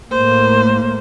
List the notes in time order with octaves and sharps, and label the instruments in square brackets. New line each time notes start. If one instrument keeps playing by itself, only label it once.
[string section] A2 A#3 [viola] C5